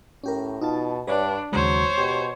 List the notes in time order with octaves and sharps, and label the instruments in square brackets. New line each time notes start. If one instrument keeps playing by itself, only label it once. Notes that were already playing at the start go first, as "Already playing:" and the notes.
[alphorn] A2 [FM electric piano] C#4 G4 A#4
[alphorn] B2 [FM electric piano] D#4 F4 A5
[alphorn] G2 [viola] D4 [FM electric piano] B4 C#5 D5
[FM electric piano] D#2 C#3 G#3 [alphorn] F#3 [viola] C5 C#5
[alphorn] B2 [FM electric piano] G4